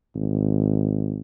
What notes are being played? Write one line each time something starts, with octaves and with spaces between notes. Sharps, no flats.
G#1